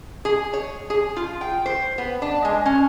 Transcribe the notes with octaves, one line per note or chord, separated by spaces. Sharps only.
G#4
C#5
G#4
F4
G5
C5
B3
D4
G#3
C#4